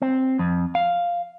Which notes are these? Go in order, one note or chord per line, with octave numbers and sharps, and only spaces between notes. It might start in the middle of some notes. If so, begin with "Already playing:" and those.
C4
F2
F5